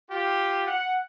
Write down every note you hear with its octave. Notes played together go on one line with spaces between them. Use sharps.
F4 G4
F#5